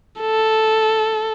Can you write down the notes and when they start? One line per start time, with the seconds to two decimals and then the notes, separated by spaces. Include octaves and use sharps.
0.21 A4